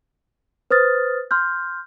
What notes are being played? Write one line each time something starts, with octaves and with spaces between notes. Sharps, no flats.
B4 C5 D#6 F6 A6
C6 F6 G6